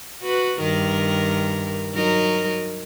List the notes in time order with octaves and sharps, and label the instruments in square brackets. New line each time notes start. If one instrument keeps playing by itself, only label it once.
[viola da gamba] F#4 B4
G2 D#3 A#4
F#3 D#4 A#4